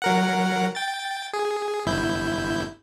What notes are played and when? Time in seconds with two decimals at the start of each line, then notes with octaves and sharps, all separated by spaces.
0.02 F#3 A#4 F#5
0.75 G5 A6
1.33 G#4
1.86 G1 E4 G6